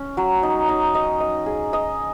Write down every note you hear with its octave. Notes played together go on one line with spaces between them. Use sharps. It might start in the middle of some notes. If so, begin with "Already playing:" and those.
Already playing: C#4
F#3
D#4
D#4
D#5
D#5
G#4
D#5